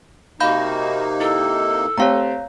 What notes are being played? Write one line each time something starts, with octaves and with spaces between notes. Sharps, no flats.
C3 A#3 D#4 F#4 F5 B5 G6
E4 A4
A3 C4 G4 C#5 F5 A#5